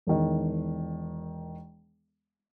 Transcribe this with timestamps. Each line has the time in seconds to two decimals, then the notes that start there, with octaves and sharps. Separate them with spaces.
0.07 E1 D#3